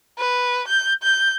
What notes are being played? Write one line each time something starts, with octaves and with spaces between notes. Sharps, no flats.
B4
G6
G6